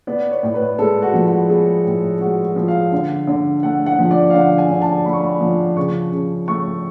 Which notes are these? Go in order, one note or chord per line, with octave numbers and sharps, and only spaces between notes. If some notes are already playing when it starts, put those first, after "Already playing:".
B3 D5
C#5
A2
B4
G#3 A4
F#4
F3
F#4
B3 G#4
A2
G#3 F#4
F#4
F3
F5
D3
D3
A3 F#5
F#5
F3
D5
F5
D3 F#5
G#5
D3
A5
A3 B5
C#6
B5
F3
C#3 C#6
C#3
A3 C#6